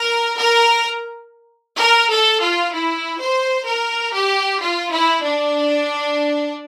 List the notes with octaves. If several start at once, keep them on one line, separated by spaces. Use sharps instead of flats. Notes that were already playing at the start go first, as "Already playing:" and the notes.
Already playing: A#4
A#4
A#4
A4
F4
E4
C5
A#4
G4
F4
E4
D4